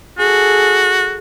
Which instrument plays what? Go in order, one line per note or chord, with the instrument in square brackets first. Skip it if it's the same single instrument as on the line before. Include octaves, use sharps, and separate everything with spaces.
[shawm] F#4 [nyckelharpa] G#4 A4